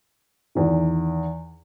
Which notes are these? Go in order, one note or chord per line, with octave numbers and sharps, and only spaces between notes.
E2 D#3